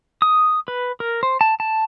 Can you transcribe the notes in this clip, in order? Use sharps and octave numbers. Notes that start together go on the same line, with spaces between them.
D#6
B4
A#4
C5
A5
A5